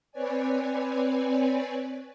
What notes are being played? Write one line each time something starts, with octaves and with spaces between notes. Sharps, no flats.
C4 B4 C#5 D5 G#5